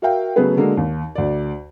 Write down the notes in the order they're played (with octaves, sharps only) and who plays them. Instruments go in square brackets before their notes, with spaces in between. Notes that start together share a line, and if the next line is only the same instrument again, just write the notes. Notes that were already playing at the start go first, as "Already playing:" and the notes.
[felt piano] F#4 A#4 E5 F5 G5
C#3 F#3 A3 B3 G#4 B4
D3 G#3 A#3 F#4 A4
D#2
D2 D5